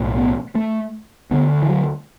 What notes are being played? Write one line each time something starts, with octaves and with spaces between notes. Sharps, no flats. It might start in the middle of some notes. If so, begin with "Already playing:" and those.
Already playing: B1 A2
B3
A3
D2 D3 B3
E3
F#3